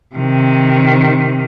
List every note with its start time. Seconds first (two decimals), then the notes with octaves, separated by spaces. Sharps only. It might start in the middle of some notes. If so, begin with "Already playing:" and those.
0.15 C3 D#3